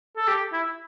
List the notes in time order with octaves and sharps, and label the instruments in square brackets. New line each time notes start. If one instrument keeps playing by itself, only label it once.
[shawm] A4
G4
E4